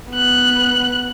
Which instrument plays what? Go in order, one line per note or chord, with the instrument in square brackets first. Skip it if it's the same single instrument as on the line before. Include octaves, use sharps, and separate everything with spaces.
[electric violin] B3 F#6